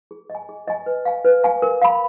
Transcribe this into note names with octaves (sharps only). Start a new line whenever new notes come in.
G#4
D#5
G#5
G#4
D#5 G#5
B4
F5 G#5
B4
F5 G#5
A#4
F5 B5